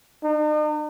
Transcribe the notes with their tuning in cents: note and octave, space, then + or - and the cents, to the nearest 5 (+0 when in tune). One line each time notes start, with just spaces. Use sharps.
D#4 -45